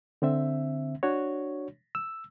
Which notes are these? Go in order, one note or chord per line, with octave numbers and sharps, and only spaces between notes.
D3 C4 E5
D4 F#4 C#5
E6